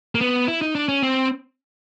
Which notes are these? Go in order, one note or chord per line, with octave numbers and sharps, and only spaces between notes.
A#3
B3
E4
D#4
D4
C#4
C4